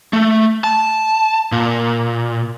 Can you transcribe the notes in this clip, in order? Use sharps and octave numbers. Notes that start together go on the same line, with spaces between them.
A3
A5
A#2